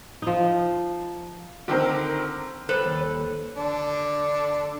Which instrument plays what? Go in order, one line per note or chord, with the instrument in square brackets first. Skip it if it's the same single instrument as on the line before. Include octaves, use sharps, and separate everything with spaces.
[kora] F3 D#4
[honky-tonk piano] D3 D#3 C4 A#4
[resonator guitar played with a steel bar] G3 A4 B4 [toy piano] C5 F#5 C6
[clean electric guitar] D#2 [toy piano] C#5
[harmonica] D3 D4